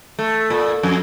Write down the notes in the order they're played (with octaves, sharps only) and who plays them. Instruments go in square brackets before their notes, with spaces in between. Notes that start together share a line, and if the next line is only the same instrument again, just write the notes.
[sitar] A3
A#2
F2